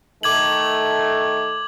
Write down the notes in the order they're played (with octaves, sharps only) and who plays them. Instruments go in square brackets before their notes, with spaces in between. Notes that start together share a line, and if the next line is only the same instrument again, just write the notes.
[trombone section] D#3 A3 [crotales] D6 G#6 F#7